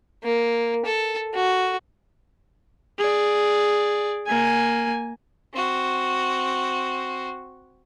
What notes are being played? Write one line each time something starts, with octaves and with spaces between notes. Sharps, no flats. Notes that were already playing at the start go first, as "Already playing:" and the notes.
A#3
A4
F#4
G#4 D5
A#3 G#5
C4 F#4